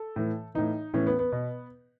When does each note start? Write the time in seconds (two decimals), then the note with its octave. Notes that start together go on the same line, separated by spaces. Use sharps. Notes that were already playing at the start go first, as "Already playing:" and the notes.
Already playing: A4
0.16 A2 E3
0.55 A2 E3 D#4
0.94 A2 E3 C#4
1.07 B3
1.19 B3
1.32 B2